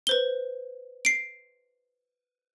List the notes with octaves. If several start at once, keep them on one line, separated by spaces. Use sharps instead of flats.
B4 C5 G7
C7 D7